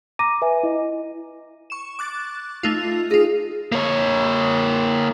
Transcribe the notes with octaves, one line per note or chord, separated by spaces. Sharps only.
A#5 D6 A#6 D#7
B4 E5 G#5
E4 D#5
C#6 E7
D6 F#6 A6
A3 D#4 F4
D#4 F4 G#4
A#3 C#5